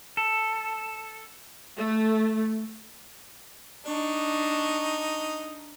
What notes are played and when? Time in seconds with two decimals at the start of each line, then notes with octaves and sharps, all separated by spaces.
0.17 A4
1.76 A3
3.86 D4 D#4 C#6